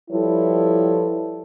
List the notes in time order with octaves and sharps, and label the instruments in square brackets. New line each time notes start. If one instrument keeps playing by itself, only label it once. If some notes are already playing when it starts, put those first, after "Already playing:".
[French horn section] F3 G3 E4 A4 B4 C#5